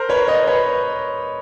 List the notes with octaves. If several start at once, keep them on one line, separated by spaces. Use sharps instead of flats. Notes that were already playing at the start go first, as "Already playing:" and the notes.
Already playing: A#4 C5
B4 C#5
C#5 D#5
B4 C#5